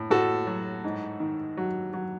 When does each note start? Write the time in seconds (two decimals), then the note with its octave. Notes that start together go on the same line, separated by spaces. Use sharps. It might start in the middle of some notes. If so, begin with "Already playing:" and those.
Already playing: A2
0.10 A2 F#4 A4
0.47 F#3
0.84 G#2
1.20 D#3
1.57 F#3
1.93 F#3